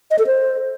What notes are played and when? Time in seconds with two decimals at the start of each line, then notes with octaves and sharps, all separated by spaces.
0.11 D#5
0.19 A4
0.27 C5